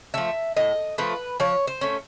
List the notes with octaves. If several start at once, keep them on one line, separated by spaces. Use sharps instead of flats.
F3 A3 E5
A2 D#5
F3 A3 B4
F3 C#5
C5
A3 C#4